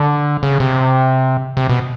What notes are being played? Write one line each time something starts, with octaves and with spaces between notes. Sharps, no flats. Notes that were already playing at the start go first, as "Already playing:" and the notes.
Already playing: D3
C#3
C3
C3
B2